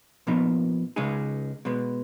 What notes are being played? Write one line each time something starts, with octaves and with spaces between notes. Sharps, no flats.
A#2 F3 B3 D#4
C#2 C#3 G#3 D#4 G#4
B2 G#3 B3